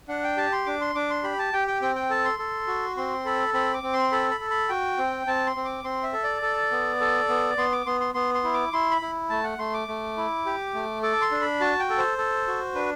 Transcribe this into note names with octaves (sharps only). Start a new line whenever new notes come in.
D4 F#5
G5
G4 A5
C6
D4 D6
C6
D4 D6
C6
G4 B5
A5
G4 G5
G5
C4 G5
G5
A4 A5
C6
A4
F#4
C4 C6
A4 B5
C4 B5
D6
C4
C6
A4 B5
B5
A4
B5
F#4 G5
C4
C4 A5
C6
C4
D6
C4 C6
E5
A4
D5
A4
B3
A4
B3
B3 C6
D6
B3 C6
C6
B3 C6
C6
E4
D6
E4 C6
B5
E4
A3 A5
F#5
A3 C6
D6
A3
E4
G4
A3
A4 D6
C6
D4
B5
F#4 A5
G5
A4
C5
A4
F#4
D4 B4